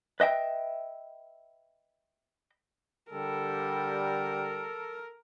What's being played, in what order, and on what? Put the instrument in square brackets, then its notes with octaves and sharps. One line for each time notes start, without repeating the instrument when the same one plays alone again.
[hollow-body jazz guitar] B4 D#5 E5 G5
[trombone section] D3 G3 [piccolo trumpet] A4 [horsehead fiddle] A#4